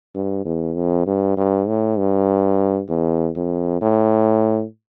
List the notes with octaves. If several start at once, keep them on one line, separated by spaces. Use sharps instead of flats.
G2
E2
F2
G2
G2
A2
G2
E2
F2
A2